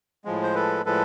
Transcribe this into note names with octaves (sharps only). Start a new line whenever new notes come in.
A2 F3 G#3
C5
A4 B4
A2 F3 G#3 A4 B4